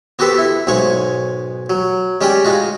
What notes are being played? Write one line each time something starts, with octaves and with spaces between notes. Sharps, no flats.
B3 F#4 G4 A4 B4 C5
E4
B1 G#2 G#3 C#5 C#6
F#3
G#3 C#4 G4 D5 G5
G#3 D#4 F4 F#4